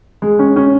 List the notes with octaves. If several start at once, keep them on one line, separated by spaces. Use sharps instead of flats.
G#3
C#4
C#4